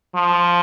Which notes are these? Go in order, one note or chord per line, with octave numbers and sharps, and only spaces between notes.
F3